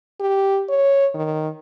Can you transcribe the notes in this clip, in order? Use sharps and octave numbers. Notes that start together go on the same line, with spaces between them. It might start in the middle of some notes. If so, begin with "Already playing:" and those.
G4
C#5
D#3